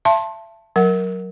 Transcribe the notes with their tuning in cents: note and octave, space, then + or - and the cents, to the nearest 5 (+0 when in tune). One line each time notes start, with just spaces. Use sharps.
E5 +35 A5 +0 C6 +30
F#3 +0 A#4 +0 F#5 +0